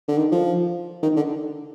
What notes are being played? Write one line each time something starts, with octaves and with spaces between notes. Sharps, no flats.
D3
D#3
F3
D#3
D3